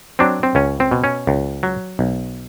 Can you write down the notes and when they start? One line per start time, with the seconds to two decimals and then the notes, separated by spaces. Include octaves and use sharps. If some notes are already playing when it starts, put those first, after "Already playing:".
0.19 F#3 C4 D4
0.43 C4
0.55 C#2 C#4
0.80 C4
0.91 B2
1.04 C#4
1.27 C#2
1.63 F#3
1.99 B1